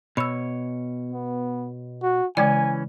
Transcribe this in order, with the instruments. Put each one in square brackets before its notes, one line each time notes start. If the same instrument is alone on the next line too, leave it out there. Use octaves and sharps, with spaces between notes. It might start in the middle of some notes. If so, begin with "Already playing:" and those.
[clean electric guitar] B2 C#5 [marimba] B5 E6
[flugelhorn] B3
F#4
[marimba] C#3 G#3 D5 [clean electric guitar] E3 C#4 [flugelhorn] G#5